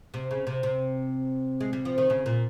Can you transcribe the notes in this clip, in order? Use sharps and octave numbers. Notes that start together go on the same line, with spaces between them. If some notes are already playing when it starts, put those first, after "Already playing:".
C3
C#3
C3
C3
G#3
G3
F3
D#3
C#3
A#2